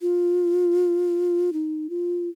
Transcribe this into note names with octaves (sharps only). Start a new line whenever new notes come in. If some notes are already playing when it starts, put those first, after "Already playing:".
F4
D#4
F4